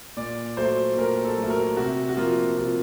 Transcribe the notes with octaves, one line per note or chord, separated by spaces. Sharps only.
A#2 D5
F#3 A3 C5
A#2 A#4
A4
F#3
A3
A#4
C3 F#4
F#4
F3 A#3 F4
C3 F4